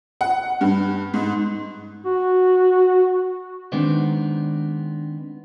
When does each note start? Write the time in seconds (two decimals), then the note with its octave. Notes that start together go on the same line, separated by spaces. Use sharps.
0.21 F#5
0.61 G2
1.14 G#2
2.05 F#4
3.72 D#3 G#3 B3 C4 D4 D#4